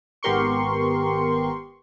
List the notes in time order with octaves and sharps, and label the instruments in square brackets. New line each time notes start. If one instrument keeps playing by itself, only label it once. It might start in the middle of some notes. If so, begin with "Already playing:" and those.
[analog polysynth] G#1 B3 G4 A#4 C6 C#6